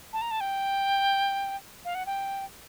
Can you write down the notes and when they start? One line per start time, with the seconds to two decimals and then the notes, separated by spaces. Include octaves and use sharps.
0.13 A5
0.22 A#5
0.31 A5
0.41 G5
1.85 F5
1.95 F#5
2.06 G5